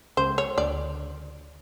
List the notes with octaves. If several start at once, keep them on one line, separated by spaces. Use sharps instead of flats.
C#2 C#3 C5
C#5
D2 D3 D5